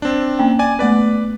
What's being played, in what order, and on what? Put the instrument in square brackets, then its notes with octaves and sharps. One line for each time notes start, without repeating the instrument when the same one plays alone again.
[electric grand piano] C4 D4
[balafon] A#3 C#4 G5
[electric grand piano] D5 G#5
[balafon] A3 B3 [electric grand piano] B4 D5